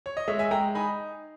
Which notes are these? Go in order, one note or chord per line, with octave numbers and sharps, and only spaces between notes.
C#5
D#5
G#3 C#5 E5
E5 G#5
G#3 G5 A#5
D#4 G#5 B5